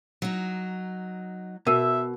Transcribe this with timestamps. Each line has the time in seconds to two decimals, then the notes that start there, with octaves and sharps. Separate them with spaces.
0.22 F#3 D#4
1.67 B2 A#4 E5